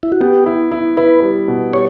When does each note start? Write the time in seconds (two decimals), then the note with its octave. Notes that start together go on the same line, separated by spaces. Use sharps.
0.03 E4
0.12 F#4
0.20 B3 G4
0.46 E4
0.71 E4
0.97 E4 B4
1.22 G3
1.48 B2
1.73 G3 C#5